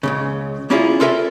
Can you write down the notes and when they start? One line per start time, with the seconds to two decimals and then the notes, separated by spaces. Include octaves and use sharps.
0.03 C#2 F#2 C#3
0.70 A#3 C#4 E4 F4 G#4
1.00 F4 A4 A#4 E5 G#5